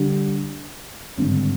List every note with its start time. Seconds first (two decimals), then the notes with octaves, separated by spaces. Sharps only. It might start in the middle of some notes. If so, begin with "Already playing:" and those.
Already playing: D3 G3 D4 G4
1.18 G#1 G2 D3